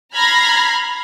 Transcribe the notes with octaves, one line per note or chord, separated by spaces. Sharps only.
A#5 B5 F6 G#6 A#6 C7